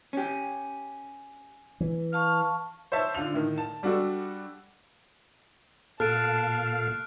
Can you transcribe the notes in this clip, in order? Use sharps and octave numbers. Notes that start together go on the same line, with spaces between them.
C#4 G4
E3
F5 A5 C#6 F6
C5 C#5 E5 A5
D3 F4 F7
A2 D#3
A5
G3 D4 F#4 A4
A#2 A4 F5 A5 F6 F#6 D7